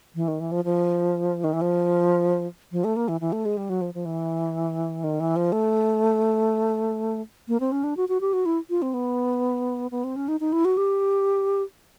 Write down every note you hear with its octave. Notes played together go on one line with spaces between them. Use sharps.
E3
D#3
E3
F3
F3
D#3
E3
F3
F3
A3
A#3
E3
E3
A3
G#3
G3
F#3
F3
F3
E3
D#3
E3
F3
A3
A#3
C4
C#4
D4
F#4
F#4
G4
F#4
E4
F4
C4
B3
B3
C4
C#4
D#4
D#4
E4
F#4
G4